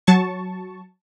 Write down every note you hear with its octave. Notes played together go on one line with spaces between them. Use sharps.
F#3 A5 C#6